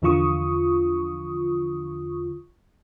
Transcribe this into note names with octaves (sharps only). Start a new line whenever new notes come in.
E2 D3 F3 F4 C#6 D#6